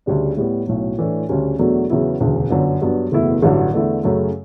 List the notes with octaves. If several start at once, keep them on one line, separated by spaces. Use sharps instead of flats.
D2 C#3 G3 D4
A2 G3 B3
B1 A2 F#3
A2 E3 A3 D4
D2 C#3 G3 C#4
E2 B2 F#3 A3 D4
E2 C#3 F#3 B3 E4
E1 D2 C#3
G1 F#2 D3
G2 F#3 B3 D4
F#1 E2 B2 A3 E4
A1 G2 D3 F#3
E2 D3 A3 E4
F#2 C#3 F#3 A3